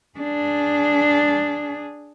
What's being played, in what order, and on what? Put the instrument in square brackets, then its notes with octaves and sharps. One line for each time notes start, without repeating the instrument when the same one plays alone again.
[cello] D4 G#4